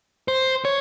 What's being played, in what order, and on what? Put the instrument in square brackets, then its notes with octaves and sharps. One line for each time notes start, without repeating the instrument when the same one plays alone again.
[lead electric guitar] C5
C#5